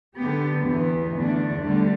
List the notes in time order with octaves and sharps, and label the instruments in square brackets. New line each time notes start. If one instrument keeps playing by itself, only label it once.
[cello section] D3 B3 G4
E2 E3 B3
E2 D3 A3 D4
D2 D3 G3